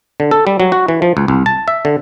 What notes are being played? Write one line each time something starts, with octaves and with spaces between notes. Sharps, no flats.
D3
A4
G3
F#3
F#4
E3
F3
C#2
C2
A5
E5
D3